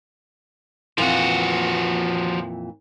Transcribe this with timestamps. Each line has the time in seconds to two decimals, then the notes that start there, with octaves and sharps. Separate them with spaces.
0.98 F2 A#2 E3 F3 F#4